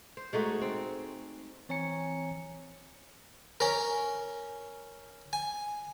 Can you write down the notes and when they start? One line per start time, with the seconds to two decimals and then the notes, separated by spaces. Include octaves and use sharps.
0.17 C5
0.33 G#3 A3 D#4 F#4
0.61 C4
1.69 E3 C4 C#5 G#5 A#5 C#7
3.60 C#4 A#4
5.33 G#5